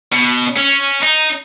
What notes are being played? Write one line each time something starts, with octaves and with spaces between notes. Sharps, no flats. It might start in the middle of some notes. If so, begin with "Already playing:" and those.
B2
C#4
D#4